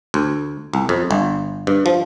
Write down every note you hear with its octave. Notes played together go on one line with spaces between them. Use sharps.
D2
C2
F2
G1
G2
F3